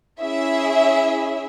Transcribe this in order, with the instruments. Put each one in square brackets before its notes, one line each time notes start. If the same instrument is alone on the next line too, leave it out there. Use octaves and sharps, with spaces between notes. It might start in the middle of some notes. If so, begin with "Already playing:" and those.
[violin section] C#4 E4 G#4 E5